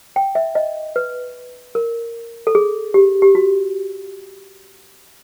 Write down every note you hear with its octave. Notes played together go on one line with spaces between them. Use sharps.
G5
E5
D#5
B4
A#4
A4
G#4
G4
G4
F#4